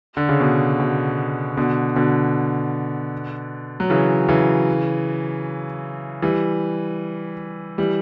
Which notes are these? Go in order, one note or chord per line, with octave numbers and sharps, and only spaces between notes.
D3
C#3
B2
B2
B2 D3
B2 D3
F#3
C#3 E3
C#3 E3
E3 G3
E3 G3